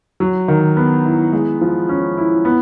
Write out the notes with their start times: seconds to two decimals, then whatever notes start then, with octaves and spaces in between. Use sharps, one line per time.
0.20 F#3
0.48 D#3
0.77 B3
1.05 E4
1.33 G#3
1.61 F3
1.89 C#4
2.18 E4
2.45 B3